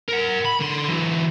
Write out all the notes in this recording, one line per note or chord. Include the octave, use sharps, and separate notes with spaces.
A#4 F#5
B5
D3 C6
E3 F#3